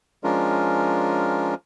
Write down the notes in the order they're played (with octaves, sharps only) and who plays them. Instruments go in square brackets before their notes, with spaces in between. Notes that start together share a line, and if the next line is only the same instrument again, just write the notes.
[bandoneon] F3 G#3 C#4 D4 F4 A#4